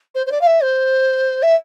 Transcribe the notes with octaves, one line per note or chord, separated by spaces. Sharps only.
C5
C5
D5
F5
E5
C5
E5